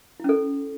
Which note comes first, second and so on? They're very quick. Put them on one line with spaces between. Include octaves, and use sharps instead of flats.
E4 C#4 A4